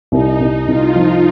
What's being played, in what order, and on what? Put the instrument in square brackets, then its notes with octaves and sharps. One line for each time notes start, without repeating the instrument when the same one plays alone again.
[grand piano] C2 [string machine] D#4
[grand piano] C2
[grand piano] C2 [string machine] F4
[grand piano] F3